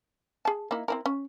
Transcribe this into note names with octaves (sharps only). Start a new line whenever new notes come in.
G#4 A5
A#3 D#4 E4
C4 E4 A#4
C#4